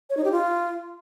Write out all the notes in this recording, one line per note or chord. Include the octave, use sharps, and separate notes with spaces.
C#5
D#4
G4
F4